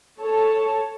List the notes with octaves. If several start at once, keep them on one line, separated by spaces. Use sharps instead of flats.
A4 C#5 A5